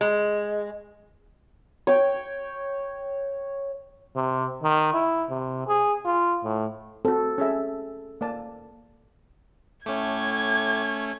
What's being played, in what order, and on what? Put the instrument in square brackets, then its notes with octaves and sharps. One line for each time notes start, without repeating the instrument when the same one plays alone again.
[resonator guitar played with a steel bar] G#3
[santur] C#5 G5
[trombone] C3
D#3
E4
C3
G#4
F4
A2
[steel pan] C4 F#4 [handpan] A4
[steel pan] C#4 G#4 E5
A#3 D5 A5
[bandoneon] A2 D6 G6 [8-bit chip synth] A3 C#4 [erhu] G#6